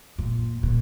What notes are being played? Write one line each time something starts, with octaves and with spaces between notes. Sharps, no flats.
A#2
A#2